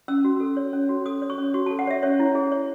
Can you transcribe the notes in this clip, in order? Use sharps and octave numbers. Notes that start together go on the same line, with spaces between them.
C#4 E6
F#4
A4
C#5
C#4
F#4
A4 D#6
C#5
C#6
C#4
F#4 C#6
A4 A5
F#5
C#5 E5
C#4 C#5
E4
G#4
C#5